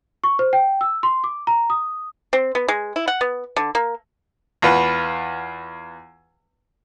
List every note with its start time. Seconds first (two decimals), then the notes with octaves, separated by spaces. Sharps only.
0.24 C#6
0.39 C5
0.53 G5
0.81 E6
1.03 C6
1.24 D6
1.47 A#5
1.70 D#6
2.33 C4
2.55 B3
2.68 G#3
2.96 E4
3.08 F#5
3.21 B3
3.56 D3
3.75 A#3
4.62 E2 F4 B4 F#5